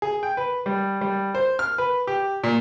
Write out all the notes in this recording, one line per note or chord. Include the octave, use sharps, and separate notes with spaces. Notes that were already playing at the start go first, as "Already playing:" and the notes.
G#4
G5
B4
G3
G3
C5
F6
B4
G4
A#2